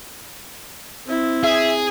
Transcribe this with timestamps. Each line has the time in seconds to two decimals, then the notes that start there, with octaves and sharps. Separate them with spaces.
1.06 C4 E4
1.43 G#4 E5